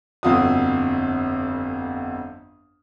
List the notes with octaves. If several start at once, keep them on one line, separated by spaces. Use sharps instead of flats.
G1 F2 F4 F#4 D#6